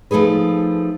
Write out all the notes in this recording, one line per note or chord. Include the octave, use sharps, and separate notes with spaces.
F3 A3 D#4 G#4 B4